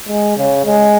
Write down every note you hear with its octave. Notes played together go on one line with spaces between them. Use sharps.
G#3
C#3
G#3